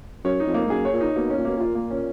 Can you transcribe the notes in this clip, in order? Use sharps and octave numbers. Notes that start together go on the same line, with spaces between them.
F#2 C#5
D#4
F2
A#3
G#2
F#2 G#4
C#5
A#2
D#4
B2 A#3
C#4
A#2
B2 A#3
A#2 F4
A#3
C#4